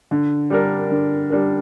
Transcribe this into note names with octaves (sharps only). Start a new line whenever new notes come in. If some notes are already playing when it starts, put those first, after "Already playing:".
D3
G3 D4 A#4
D3
G3 D4 A#4